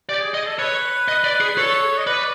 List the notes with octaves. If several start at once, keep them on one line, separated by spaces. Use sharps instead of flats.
G4 D5
G#4
G#4 D#5
A4
B4 C#5
D#5
D5
G#4
A4 C#5
D#5
B4 D5